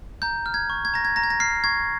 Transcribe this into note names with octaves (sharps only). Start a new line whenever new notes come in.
A#5 G6
F6
G#6
C#6
G#6
A#5 A#6
G#6
A#5 A#6
G#6
A#6
F6 C7
C#6 G#6